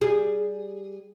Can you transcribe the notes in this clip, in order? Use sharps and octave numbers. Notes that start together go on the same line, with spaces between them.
G3 G#4